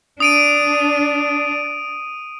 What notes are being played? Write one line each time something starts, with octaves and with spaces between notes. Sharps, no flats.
D4 D#6 D7 D#7